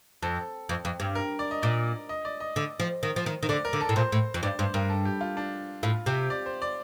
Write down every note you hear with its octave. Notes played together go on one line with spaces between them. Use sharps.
F2 A4
F2
F2
G2
A#4
D5
D#5
A#2 D5
D#5
D5
D#5
D3
F3
D#3
F3
D#3
D#3
D3 D5
A#4
D3
A4
A2
A#2 C5
A2
F2
G2 D5
G2 C5
G2 A#4
A4
G4
F4
D4
A2 F4
C3 G4
D5
C5
D5